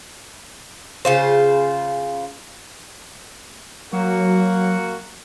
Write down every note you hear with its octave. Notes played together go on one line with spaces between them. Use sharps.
C#3 F4 C5
F#3 A#3 F#4